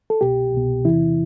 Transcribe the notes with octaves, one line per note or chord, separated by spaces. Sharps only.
A4
C2 B2 G4
C2 B2
E2 C3 E3 E4